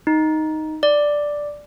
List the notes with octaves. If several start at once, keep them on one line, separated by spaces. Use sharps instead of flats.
D#4
D5